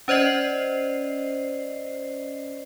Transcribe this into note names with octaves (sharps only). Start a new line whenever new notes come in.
C#4 C5 D5 D#5 C7